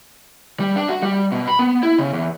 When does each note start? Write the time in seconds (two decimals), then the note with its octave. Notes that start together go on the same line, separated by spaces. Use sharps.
0.60 G3
0.76 D4
0.88 F#4
1.03 G3
1.32 B2
1.47 B5
1.59 B3
1.83 E4
1.98 C#3
2.13 E2